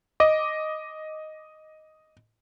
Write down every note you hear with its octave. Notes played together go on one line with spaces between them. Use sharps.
D#5 D6